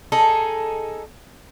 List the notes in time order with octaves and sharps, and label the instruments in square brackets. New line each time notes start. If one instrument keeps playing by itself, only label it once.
[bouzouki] D#4 G#4 A4